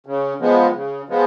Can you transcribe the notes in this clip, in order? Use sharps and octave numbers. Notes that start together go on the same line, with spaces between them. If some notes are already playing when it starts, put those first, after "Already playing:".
C#3
F3 G#3 B3
C#3
F3 G#3 B3